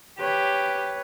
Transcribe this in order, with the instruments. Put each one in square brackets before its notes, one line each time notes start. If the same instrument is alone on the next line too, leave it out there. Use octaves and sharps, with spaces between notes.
[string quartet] G4 [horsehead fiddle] B4 C#5